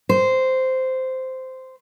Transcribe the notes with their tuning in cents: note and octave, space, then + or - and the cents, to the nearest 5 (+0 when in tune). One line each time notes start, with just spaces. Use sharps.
C5 -10